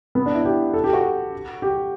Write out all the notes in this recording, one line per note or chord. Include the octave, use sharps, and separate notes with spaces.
B3
D4
E4
G4
A4
G4
F#4
G4